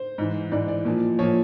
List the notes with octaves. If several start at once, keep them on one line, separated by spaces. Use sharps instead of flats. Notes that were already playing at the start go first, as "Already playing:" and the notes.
Already playing: C5
G#2 E3
G#2 E3 D5
D5
A#2 F3
A#2 F3 C#5